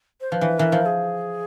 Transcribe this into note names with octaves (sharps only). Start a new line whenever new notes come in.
C5
F3 B4
E3
E3 A#4
F3
G#4